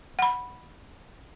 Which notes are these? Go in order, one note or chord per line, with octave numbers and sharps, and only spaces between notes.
F#5 B5